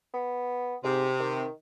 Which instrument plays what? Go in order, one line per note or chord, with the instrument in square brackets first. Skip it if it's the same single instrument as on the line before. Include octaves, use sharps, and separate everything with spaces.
[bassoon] B3
[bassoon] G#2 [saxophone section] C3
[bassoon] D#3